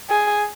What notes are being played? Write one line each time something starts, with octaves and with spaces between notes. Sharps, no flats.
G#4